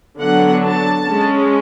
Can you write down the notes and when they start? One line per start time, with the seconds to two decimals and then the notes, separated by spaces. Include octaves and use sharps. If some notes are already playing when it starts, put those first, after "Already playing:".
0.20 D3 F#3 B3 D4 F#5
0.63 A5
1.07 G#3 C#4